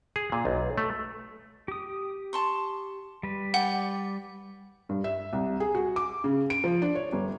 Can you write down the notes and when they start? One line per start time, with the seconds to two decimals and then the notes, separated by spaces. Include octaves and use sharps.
0.16 G#4
0.32 A#2
0.45 B1
0.78 A3
1.68 G4 D#6
2.33 A5 C6 C#6
3.23 G3 B4
3.54 D5 F#5 G5
4.89 G2
5.04 E5
5.33 C2
5.60 G#4
5.75 F#4
5.96 D6
6.24 C#3
6.50 D7
6.64 F3
6.82 D4
6.95 C#5
7.13 G1